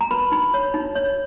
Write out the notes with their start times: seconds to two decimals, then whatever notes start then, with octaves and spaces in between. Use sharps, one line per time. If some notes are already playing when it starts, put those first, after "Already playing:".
0.01 A#5
0.11 B4 B5
0.32 D#4 B5
0.54 C#5
0.74 D#4
0.95 C#5